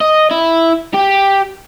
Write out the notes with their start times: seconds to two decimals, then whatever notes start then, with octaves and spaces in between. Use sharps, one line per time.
0.01 D#5
0.31 E4
0.94 G4